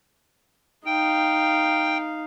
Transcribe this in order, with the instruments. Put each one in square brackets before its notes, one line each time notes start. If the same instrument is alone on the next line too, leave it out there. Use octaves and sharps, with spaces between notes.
[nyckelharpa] D#4 F5 [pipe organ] G5